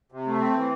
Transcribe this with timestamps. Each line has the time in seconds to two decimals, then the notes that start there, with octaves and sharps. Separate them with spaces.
0.12 C3
0.27 A3
0.40 C4
0.55 E3